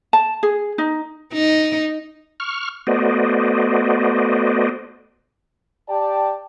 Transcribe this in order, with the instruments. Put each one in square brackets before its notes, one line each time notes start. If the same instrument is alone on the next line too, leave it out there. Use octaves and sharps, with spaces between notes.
[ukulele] A5
G#4
D#4
[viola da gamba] D#4
[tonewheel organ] C#6 F6
A3 B3 F#4 C5 D5 D#5
[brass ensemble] G4 D5 G5 A5